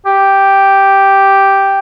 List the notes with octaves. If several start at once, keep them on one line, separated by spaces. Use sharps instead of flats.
G4